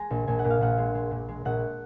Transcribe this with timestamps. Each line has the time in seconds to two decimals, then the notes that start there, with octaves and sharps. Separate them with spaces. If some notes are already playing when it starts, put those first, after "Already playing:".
Already playing: G#3 G#5 A#5
0.10 A#1
0.27 A#1 G#5
0.39 F#5
0.45 A#2
0.50 F5
0.61 A#1 F#5
0.78 G#3
0.95 G#3
1.11 A#2
1.28 G#3
1.45 A#1 F#5